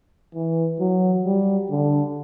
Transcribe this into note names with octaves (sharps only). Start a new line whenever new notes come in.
E3
F#3
G3
D3